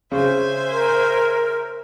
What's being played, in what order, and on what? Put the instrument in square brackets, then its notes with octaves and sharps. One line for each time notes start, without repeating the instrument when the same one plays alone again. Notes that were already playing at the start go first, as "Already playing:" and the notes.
[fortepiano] C#3 [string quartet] C5 E5 G#5
[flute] A#4